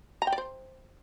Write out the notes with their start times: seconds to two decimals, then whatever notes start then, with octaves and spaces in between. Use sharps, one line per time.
0.22 A#5
0.27 G5
0.32 D5
0.38 C5